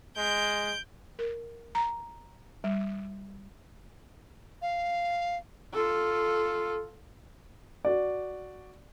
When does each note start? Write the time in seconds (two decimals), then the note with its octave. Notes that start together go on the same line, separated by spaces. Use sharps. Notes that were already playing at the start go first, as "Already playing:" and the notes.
0.17 G#3 G6 D7
1.19 A#4
1.75 A#5
2.64 G3
4.62 F5
5.73 F4 A4
7.85 F#4 D5